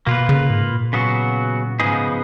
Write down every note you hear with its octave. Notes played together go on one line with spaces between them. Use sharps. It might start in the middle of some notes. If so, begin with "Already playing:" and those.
B2 A#3 F4 B4
C#3
G#2
A#2
C#3 F#3 B3 F#4
G#2 C#3 F3 B3 D#4 G#4